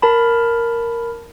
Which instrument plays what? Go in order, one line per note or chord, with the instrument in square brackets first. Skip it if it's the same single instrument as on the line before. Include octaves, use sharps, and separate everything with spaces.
[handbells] A#4 A5 B5